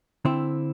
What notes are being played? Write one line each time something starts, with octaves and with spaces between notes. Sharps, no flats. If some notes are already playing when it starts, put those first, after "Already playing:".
D3 C4 E4